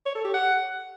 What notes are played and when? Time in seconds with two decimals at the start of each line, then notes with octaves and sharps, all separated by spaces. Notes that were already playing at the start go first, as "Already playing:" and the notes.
0.06 C#5
0.15 A4
0.25 G4
0.34 F#5